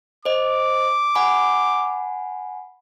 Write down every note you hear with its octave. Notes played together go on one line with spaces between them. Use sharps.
C5 D#5 D6
F#5 G#5 B5